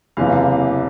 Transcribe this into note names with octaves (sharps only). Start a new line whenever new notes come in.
F#1 E2 C3 E3 F5